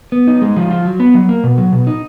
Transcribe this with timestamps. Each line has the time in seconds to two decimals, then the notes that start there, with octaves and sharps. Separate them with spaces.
0.12 B3
0.27 D#4
0.42 G#3
0.57 F3
0.71 F4
0.85 F#3
1.00 B3
1.14 F#3
1.29 A#3
1.44 B2
1.58 F#3
1.72 B2
1.87 D#4